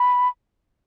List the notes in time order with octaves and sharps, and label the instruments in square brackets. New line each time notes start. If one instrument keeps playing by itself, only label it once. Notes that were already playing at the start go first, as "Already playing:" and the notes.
Already playing: [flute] B5